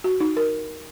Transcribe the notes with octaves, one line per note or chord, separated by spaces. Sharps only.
F#4
D#4
A#4